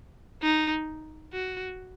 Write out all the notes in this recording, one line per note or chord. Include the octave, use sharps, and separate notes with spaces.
D#4
F#4